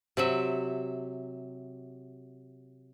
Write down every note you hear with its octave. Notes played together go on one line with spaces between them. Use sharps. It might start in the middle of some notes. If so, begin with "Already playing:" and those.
C3 F#3 E5